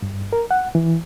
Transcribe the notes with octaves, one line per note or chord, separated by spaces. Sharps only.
G2
A#4
F#5
E3